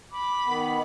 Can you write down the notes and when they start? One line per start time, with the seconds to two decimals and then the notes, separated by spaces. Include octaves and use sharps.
0.12 B5 D6
0.46 D#3 B3